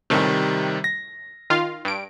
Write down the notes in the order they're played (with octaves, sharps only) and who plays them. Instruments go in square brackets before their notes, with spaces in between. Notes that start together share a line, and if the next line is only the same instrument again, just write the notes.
[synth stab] C#2 A2 A3 [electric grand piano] C3 D#3 G3
[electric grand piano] A#6
[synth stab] D#3 F4 F5
G2 D7